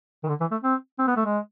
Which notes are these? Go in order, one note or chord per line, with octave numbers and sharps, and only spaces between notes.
D#3
D3
E3
A3
C4
C4
B3
A3
G#3